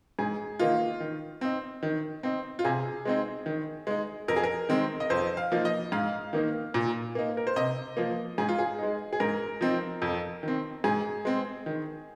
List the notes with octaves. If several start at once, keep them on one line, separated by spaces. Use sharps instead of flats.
G#2 G#4
D#3 A#3 D#4 F4
D#3
C4 D#4
D#3
C4 D#4
F4
C3 G#4
G#3 C4 D#4
D#3
G#3 D#4
F2 A#4
G#4
A#4
D#3 G#3 C4
D#5
F2 C5
F5
F3 A#3 D#4
D#5
G#2 F5
D#3 A#3 D#4
A#2
A#3 D#4
A#4
C5
C3 D#5
F3 A#3
G#2 G#4
F4
G#4
G#3 D#4
G#4
G#2 A#4
F3 C4 D#4
F2
D#3 C4
G#2 G#4
G#3 C4
D#3